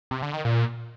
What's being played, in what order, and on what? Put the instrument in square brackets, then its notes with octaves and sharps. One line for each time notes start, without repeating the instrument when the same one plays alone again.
[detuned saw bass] C3
D3
D#3
A#2